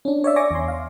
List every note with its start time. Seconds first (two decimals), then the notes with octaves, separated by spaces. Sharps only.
0.05 C#4 D4
0.24 C#5 D5 E5
0.36 D5 G#5 C#6 D6 A#6
0.51 E2 C6
0.68 F5